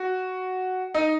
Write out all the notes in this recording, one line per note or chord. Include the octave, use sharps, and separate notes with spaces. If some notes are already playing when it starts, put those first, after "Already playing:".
Already playing: F#4
D#4